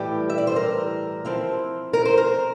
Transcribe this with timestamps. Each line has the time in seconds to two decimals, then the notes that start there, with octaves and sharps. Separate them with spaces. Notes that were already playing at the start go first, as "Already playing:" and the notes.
Already playing: A2 E3 G3 G4
0.30 E5
0.38 D5
0.47 C5
0.56 A#4
1.25 F3 C4 E4
1.93 A#4
2.05 C5
2.17 A#4